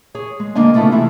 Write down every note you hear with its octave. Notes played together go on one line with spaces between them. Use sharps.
G#4 C#5
G#3
D3 A#3 D4 D#5 G#5
C#3 A3 B3 E4 F4 A4
C3 E3 E4 F4 G#4